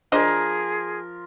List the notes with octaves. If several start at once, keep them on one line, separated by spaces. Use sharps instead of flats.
F3 D4 G#4 A#4 C5 D#5